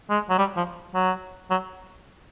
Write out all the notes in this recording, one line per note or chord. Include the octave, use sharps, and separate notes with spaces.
G#3
F#3
G3
F3
F#3
F#3